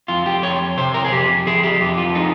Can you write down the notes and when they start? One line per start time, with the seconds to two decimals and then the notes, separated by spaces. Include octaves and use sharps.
0.08 F2 F4
0.26 G4
0.43 F2 C#5
0.77 C3 C5
0.94 A#4
1.05 G#4
1.12 F2 G4
1.47 F3 G#4
1.63 G4
1.81 F2 G4
1.97 F4
2.15 F3 D#4